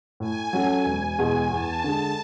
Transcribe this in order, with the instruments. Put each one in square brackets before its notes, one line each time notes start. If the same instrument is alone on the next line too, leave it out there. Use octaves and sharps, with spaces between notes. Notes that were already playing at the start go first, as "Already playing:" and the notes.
[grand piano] A2 [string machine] G#5
[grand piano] F#3 C#4 F#4 A4
E1
E2 B2 G#3
[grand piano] E2 [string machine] A5
[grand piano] D3 G#3